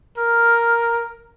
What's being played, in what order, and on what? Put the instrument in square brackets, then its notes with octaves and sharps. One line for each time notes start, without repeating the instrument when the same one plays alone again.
[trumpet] A#4 [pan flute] F6